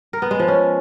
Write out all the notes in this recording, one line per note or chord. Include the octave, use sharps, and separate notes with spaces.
A#4
B3
G#3
F3
C#4